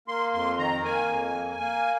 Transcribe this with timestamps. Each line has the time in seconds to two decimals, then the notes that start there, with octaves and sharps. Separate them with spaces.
0.08 A#3 C6
0.33 F2 C6
0.58 D#3 A#5
0.83 A#3 G#5
1.09 F2
1.34 A#3
1.60 A#3